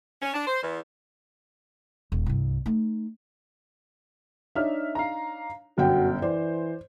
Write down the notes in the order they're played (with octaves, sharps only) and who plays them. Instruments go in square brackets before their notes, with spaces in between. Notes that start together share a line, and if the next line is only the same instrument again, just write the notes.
[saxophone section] C#4
D4
C5
E2
[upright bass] D#1
C2 G2
A3 D#4
[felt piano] D4 D#4 C#5 [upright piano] E5 F6
[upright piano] F5 A#5
[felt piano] G1 F#5 G5 [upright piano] F#2 B2 [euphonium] F#4
[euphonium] E3 [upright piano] C5 [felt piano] D5